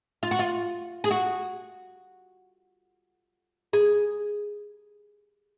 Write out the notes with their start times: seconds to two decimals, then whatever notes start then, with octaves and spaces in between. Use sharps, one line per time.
0.23 F4
0.31 F#4
0.39 F4
1.04 G#4
1.11 F#4
3.73 G#4